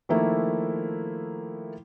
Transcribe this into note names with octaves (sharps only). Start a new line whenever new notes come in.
D#3 F3 A3 A#3 E4